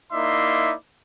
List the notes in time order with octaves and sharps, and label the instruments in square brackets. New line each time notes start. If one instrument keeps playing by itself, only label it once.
[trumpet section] A#3 D#4 E4 D5 E5 C6